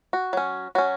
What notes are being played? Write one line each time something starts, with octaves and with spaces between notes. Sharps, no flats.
F#4
F#3 C#4
F#3 C#4 F#4